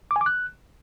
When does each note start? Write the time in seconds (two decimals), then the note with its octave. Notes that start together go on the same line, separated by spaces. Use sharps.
0.11 D6
0.16 G#5
0.21 D6
0.26 F#6